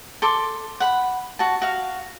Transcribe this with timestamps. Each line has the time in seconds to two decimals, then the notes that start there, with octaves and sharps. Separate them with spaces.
0.22 A4 C6 D6
0.80 F#5 B5
1.39 F#4 A5
1.62 F#4 F5